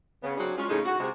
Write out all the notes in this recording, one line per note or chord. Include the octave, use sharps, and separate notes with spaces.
C#3 B3
F#3 C4 D4 G#4
G#3 C#4 F4
A2 C#3 G#3 D#4 G#4 A4
F#4
C3 G#3 F#4